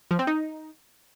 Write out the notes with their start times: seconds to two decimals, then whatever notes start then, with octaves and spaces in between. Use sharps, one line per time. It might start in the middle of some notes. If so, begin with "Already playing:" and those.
0.11 F3
0.19 C4
0.27 D#4